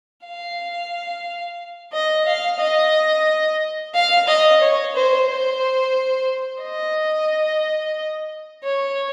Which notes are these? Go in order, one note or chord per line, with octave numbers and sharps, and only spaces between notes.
F5
D#5
F5
D#5
F5
D#5
C#5
C5
C5
D#5
C#5